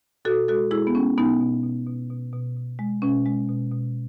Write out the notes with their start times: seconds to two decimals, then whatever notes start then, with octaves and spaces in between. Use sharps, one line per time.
0.25 B2 F#4 A4
0.48 G#3 F#4 A4
0.71 G#3 E4 G#4
0.87 B3
0.95 G#3 C#4
1.17 B2 B3 D#4
1.41 B2
1.63 B2
1.87 B2
2.10 B2
2.33 B2
2.56 B2
2.79 G#3
3.02 B2 C#4
3.26 G#3
3.49 B2
3.72 B2